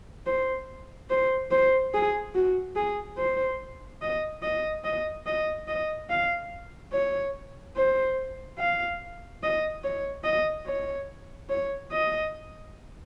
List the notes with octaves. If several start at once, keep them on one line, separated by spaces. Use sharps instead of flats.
C5
C5
C5
G#4
F#4
G#4
C5
D#5
D#5
D#5
D#5
D#5
F5
C#5
C5
F5
D#5
C#5
D#5
C#5
C#5
D#5